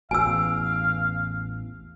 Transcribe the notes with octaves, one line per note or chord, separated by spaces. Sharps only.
A1 E2 F5 G#5 E6